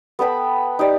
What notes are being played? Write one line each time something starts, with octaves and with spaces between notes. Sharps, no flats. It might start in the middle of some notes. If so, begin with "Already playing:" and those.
B3 A4 G5 B5
D#4 G4 D5